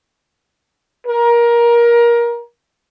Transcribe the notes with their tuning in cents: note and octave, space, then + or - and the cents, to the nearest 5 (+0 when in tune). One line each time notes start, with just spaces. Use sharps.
A#4 +20